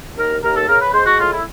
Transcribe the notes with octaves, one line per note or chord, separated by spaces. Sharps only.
D#2 A#4
D#2 A#4
A4
C#3 A#4
B4
G#3 C5
F#4
A2 F4
E4